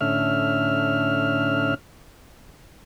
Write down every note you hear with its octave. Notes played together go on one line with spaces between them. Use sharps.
A2 D3 C#4 E5 F6